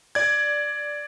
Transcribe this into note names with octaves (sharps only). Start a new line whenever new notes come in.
D5 G#6